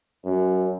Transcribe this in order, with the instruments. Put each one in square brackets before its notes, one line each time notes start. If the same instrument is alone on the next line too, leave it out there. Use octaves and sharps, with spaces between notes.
[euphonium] F#2